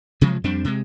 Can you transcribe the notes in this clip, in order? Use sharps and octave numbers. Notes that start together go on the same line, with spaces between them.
C3 F3 F#3 G#3
F2 G3 C4 D4
C3 G#3